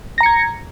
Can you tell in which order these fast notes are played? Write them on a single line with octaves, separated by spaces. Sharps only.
A#6 A#5 C#7 G#6